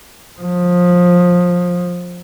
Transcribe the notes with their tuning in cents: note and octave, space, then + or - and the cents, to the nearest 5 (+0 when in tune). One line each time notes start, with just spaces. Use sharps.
F3 +20